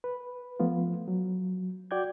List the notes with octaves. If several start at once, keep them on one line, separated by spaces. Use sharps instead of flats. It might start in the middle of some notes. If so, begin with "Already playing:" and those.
B4
F3 A3 B3 F4
F#3
F#4 D5 G5 G6 G#6